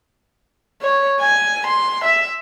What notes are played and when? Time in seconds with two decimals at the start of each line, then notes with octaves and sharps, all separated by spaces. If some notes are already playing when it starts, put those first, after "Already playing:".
0.82 C#5
1.21 G#5
1.67 C6
2.05 E5